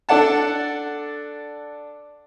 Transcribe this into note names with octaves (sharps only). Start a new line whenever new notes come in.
D4 A4 D5 F#5 A5